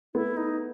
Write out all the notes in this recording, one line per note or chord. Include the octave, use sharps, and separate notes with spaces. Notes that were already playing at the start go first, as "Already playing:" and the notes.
A3 B3 E4
D#4